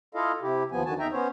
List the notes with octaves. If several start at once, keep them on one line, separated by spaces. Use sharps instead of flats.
E4 F4 A4 D#5 F5
C3 E4 G4
D#2 F3 B3 G#5
D3 D#3 F#4 G#5 A5
E2 D#4 E5 G5 A#5
B3 C#4 C5 C#5